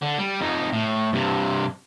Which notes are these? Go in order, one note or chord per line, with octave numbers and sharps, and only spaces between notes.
D3
G3
F2 D#4
A2
G2 C3